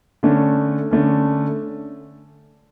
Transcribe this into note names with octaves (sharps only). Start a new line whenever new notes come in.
D3 A3 C#4
D3 A3 C#4